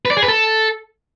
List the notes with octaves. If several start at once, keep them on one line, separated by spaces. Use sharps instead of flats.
B4
D5
G#4
B4
A4